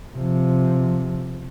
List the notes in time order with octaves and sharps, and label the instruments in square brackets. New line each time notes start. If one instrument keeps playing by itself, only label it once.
[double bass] C3 F3